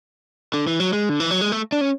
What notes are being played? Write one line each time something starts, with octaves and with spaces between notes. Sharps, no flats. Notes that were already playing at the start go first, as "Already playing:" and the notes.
D3
E3
F#3
G#3
D3
E3
F#3
G#3
A3
D4
C#4